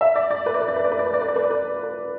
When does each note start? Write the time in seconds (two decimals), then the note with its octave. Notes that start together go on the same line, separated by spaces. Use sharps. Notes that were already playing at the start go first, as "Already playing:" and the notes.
0.01 E5
0.16 D5
0.31 D5
0.46 B4
0.54 D5
0.61 B4
0.68 D5
0.76 B4
0.84 D5
0.91 B4
0.99 D5
1.06 B4
1.14 D5
1.21 B4
1.28 D5
1.36 B4
1.44 D5
1.50 B4
1.83 B4